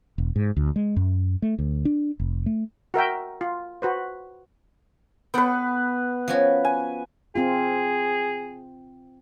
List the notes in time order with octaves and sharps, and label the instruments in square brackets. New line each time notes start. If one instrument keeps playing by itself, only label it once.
[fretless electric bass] E1
G#2
D2
G#3
F#2
A3
D2
D4
F1
A3
[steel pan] F#4 A#4 E5 G5
F4
F#4 B4 C5
[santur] B3 B4 [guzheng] A4 F#5 G5
[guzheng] F3 C#4 F#4
[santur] G#5
[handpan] C4 F4 [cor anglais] G#4